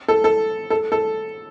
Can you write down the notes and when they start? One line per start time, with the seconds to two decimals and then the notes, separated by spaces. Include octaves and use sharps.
0.08 A4
0.24 A4
0.70 A4
0.92 A4